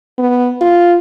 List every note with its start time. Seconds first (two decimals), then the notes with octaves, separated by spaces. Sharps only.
0.18 B3
0.61 F4